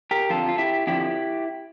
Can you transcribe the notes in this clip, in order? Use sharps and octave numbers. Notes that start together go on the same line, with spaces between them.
G4 A#4
F2 D3 F3 F4 A4
F4
E4 G4
F2 D3 F3 E4 G4